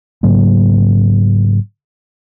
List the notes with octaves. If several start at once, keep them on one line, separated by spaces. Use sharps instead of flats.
G#2 C#3 F#3 A#3